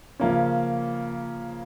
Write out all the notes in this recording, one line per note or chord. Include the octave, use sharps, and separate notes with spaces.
C#3 F3 A#3 C#4